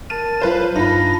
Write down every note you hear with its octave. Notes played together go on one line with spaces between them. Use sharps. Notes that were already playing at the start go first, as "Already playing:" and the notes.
A#4 A5 A6 D#7
F#3 F4 B4 C5
G2 D4 D#4 F4 B5 A#6